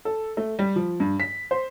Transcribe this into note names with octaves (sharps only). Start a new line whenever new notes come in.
A4
A3
G3
F3
G2
B6
C5